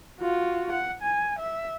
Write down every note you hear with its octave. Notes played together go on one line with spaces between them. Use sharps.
F4 F#4
F#5
G#5
E5